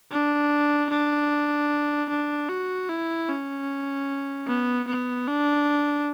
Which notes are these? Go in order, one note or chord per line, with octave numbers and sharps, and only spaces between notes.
D4
D4
D4
F#4
E4
C#4
B3
B3
D4